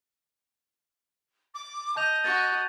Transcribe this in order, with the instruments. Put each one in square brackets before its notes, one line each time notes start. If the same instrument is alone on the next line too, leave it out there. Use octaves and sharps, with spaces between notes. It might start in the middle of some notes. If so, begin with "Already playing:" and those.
[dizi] D6
[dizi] D#5 [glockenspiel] A5 G6 F7
[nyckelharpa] F#4 [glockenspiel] A6